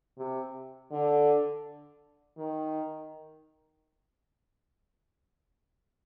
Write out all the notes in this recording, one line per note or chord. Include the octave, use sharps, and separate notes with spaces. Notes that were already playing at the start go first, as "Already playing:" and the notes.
C3
D3
D#3